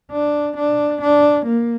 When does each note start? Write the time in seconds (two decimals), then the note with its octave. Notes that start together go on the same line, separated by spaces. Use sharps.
0.12 D4
0.56 D4
1.01 D4
1.46 A#3